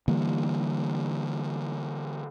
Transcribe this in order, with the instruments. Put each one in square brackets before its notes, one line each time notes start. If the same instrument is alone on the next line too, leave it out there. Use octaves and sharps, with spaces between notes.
[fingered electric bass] D3 E3 G3 A#3